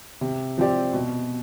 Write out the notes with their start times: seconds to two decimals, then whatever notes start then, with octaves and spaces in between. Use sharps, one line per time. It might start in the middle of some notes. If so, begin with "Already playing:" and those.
0.21 C3
0.58 F3 C4 G4 D5
0.93 B2